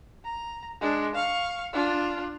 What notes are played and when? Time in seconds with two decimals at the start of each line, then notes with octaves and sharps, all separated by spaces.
0.25 A#5
0.81 G#3 D4
1.15 F5 C#6
1.73 D4 F4